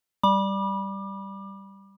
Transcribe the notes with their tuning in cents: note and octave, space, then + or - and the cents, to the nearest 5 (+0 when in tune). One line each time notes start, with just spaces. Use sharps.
G3 +0 B5 -25 D6 +25